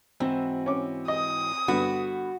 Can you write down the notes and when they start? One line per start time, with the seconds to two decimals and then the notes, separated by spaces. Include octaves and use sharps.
0.20 G#2 E3 C4 F#4
0.66 C#4 D6
1.08 D#5 D#6
1.68 G2 D3 B3 F#4